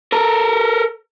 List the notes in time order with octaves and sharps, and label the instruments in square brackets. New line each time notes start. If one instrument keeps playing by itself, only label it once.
[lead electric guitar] A4 A#4